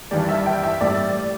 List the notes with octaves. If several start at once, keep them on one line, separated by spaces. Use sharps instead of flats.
G2 E3 G3 D5
E5
G5
E5
A2 G3 D5